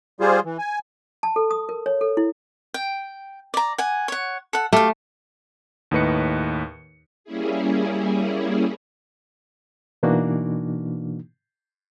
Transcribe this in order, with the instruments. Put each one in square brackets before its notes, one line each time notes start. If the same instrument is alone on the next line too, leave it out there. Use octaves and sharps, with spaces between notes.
[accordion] G3 F4 G#4 C5
E3
G#5
[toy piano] A5
A4
D#6
A#4
C#5
A4
E4
[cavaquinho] G5
D5 A#5
F#5 G#5
C#5 F#5
A4 F#5
[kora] A3 [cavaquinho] G4 F5
[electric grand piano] D#2 A2 D#4 B4 D#5 C#7
[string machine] G3 A#3 C#4 E4 G#4
[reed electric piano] B2 E3 A#3 D4 D#4 F#4